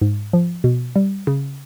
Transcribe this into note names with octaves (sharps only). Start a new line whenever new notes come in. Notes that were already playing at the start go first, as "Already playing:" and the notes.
G#2
F3
B2
G3
C#3